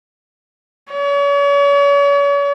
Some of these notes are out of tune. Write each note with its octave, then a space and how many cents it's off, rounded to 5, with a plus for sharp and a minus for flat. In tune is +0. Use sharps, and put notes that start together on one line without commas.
C#5 +40